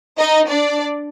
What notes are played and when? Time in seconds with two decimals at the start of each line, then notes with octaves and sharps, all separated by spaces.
0.18 D#4 D#5
0.49 D4 D5